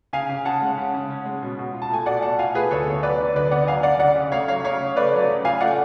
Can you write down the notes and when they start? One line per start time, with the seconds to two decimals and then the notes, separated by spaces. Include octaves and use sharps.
0.13 C#3 F5 G#5
0.29 C#3
0.45 C#4 F#5 A5
0.62 G#3
0.78 C#3
0.94 C#3
1.10 C#4
1.25 G#3
1.42 B2
1.59 B2
1.74 F4
1.82 A5
1.91 A3 G#5
2.06 B2 D5 F#5
2.22 B2 F#5 A5
2.39 F4 F5 G#5
2.55 A3 G#4 B4
2.71 D2 A4 C#5
2.87 B3
3.03 F#3 B4 D5
3.20 D3
3.36 D2 B4 D5
3.51 B3 D5 F#5
3.67 F#3 F5 G#5
3.83 D3 D5 F#5
4.00 C#3 D5 F#5
4.16 C#3
4.32 A3 C#5 F5
4.48 F#3 C#5 F5
4.64 C#3 C#5 F5
4.81 C#3
4.96 A3 B4 D5
5.13 F#3
5.29 C#3
5.45 F4 F5 G#5
5.61 A3 D5 F#5